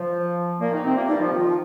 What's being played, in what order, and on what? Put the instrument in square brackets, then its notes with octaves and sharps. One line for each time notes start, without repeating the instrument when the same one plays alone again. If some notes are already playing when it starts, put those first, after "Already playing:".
Already playing: [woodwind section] F3
A#2 A#3
D#3 D#4
C3 C4
A#2 A#3
[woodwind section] G2 G3 [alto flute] D#4
[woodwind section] F3
[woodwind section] D#3 [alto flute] F4
[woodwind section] F3